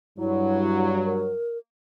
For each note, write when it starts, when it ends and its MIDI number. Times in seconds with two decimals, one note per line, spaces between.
0.18 1.33 43
0.18 1.33 54
0.18 0.90 64
1.04 1.58 70